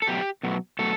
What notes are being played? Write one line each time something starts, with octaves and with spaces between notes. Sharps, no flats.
A4
B2 F#3 A3 G4
B2 F#3 A3
B2 F#3 A3 A4